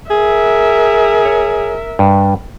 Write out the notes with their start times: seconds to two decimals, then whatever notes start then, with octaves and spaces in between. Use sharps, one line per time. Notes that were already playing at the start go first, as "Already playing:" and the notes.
0.11 G#4 A#4 E5
1.25 C#5
1.99 G2